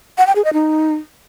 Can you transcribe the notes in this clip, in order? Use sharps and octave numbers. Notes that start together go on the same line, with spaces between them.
F#5
G5
G#4
D#5
D#4